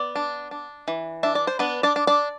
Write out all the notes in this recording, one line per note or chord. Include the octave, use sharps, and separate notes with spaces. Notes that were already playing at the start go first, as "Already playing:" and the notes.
Already playing: B3 D5
D4
D4
E3
D4 E5
D5
C5
B3 D4 B4
D4 D5
D4
D4 D5